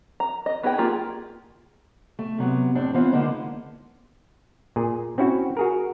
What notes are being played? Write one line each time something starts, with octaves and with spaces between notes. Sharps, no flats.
A#5
D#5
B3 D#4 G#4 A4 G5
A#3 F4 G4 G#4 G#5
A3
C3 F#3 B3
F2 A2 C4 D4
E3 B3 C4 F4 C5
D3 G#3 A#3 B3 D4 D#4
A#2 G#4
C4 C#4 E4 F#4
F#4 G#4 A#4